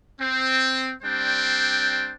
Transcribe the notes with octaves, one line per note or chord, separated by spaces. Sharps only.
C4
G3 C4 D4 C5 G5